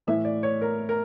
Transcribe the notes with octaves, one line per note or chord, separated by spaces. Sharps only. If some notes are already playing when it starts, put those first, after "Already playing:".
A2 E3 E5
D5
C#5
A#4
A#4